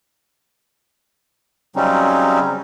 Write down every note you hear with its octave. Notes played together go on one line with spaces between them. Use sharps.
C#3 F#3 G3 C4 C#4 D#4